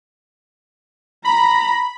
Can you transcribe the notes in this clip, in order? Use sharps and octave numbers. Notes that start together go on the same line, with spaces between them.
A#5 B5